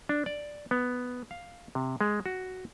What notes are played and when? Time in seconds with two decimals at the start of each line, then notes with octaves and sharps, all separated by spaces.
0.09 D4
0.26 D5
0.71 B3
1.31 F5
1.75 C3
2.01 G#3
2.26 F#4